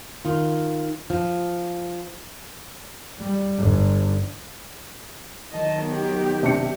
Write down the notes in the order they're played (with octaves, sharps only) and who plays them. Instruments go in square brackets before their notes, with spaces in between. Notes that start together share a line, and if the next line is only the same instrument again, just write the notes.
[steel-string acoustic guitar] D#3 F4
F3
[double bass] G3
G1
[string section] D#3 F#3 [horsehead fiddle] D#5 A5
[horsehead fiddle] B3 G4
[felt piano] C3 D4 C#7